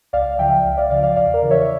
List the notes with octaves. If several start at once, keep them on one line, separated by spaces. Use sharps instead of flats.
C#2 D5 F5
C#3 F3 E5 G5
C#2
D5 F5
C#3 F3 D5 F5
D5 F5
E2 D5 F5
A#4 D5
C#3 E3
C#5 E5